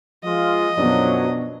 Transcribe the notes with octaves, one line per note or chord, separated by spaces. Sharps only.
F3 G#3 F4 D#5
F#2 B2 F3 F#3 D4